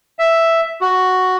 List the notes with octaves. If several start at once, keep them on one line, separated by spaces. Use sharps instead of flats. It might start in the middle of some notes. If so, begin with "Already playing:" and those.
E5
F#4